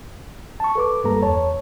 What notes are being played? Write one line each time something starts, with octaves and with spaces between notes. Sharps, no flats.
A5 C#6
A4 B4 D6
G2 G3 A#3 A4 B4 A#5
E2 C#5 A5